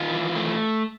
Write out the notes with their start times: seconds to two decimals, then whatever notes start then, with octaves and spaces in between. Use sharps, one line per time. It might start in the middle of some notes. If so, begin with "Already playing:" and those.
Already playing: D#3 F4
0.09 E3
0.35 A3